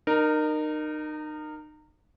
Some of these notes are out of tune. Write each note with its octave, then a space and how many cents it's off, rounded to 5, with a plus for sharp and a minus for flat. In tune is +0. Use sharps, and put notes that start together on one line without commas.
D#4 -30 A#4 +0